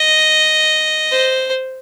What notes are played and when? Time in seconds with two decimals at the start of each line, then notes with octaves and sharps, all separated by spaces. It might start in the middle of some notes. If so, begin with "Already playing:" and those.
Already playing: D#5
1.12 C5